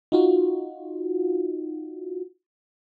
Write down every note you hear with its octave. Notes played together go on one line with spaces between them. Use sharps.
D#4 F4 F#4